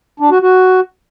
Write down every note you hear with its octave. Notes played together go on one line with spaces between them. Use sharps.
D4
F#4
F#4